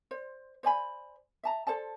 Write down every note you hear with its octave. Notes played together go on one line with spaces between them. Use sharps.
C5 D5
C5 D5 G#5 B5
E5 A5 A#5
A4 C5 D5 A5